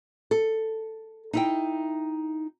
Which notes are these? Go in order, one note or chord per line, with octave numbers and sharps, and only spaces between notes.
A4
D#4 E4 G5